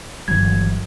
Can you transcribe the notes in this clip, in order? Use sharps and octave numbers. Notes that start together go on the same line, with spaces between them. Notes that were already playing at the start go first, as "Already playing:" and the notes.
G1 E3 F#3 G#6